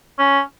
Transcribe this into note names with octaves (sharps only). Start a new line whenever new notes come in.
C#4